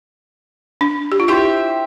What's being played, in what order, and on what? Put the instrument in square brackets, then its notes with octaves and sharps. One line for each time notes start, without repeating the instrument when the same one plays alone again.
[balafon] D4
G4
F4
[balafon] E4 [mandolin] G4 C5 E5